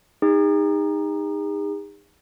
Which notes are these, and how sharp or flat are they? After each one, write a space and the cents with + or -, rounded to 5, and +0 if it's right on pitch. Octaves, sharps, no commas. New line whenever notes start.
D#4 +0 G#4 -45